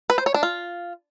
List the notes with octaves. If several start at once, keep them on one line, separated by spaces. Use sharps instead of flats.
B4
C5
C#5
D4
F4